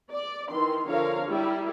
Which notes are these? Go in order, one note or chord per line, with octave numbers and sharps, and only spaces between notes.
D5
D#3 E3 C6
D3 F3 A#4 C#5 F5
G3 E4 A#4